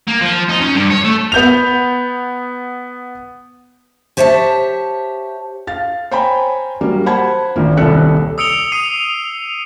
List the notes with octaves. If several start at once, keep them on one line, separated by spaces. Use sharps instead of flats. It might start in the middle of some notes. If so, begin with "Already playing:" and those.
A#3
F3
D#4
C#4
G2
C#5
A3
B3 G6 F7
G4 C5 C#5 E5 G#5 A5
F5 A6
C5 C#5 G5 G#5 A#5 B5
F#3 G3 A#3
C5 F#5 A5 B5 G#6
G#1 A#2 A#3
D#1 C2 D#3 A4 F#6 C#7
D#6 E6 C#7 D7 F7 G7
D#6 C7 D#7